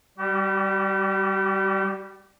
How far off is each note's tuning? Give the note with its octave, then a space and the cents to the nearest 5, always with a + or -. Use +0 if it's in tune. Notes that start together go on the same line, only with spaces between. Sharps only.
G3 +0 G4 -45